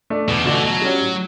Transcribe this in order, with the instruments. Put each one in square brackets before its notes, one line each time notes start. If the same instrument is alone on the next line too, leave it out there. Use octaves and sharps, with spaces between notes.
[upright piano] A3 D4
[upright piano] E2 [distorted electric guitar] B2
[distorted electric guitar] C#3
[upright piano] B2 A3 D4 F#4 [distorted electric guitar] D3
[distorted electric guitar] E3
[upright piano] B2 [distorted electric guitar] F#3
[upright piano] G3 C#4 F#4
A2